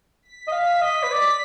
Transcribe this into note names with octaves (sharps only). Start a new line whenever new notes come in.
B6
D#5
F5
D#5
B4
D5